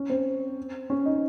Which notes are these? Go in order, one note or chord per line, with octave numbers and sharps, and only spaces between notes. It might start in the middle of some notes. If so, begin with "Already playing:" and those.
Already playing: C#4
C4
C#4
D#4